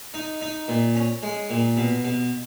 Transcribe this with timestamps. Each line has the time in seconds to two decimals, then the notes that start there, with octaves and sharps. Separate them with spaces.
0.14 D#4
0.42 D#4
0.68 A#2
0.96 C#4
1.23 G#3
1.50 A#2
1.77 B2
2.05 B2